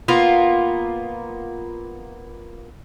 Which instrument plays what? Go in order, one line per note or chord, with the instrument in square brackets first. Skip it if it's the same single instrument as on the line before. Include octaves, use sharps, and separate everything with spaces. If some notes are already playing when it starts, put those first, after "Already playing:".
[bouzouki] A#3 B3 F4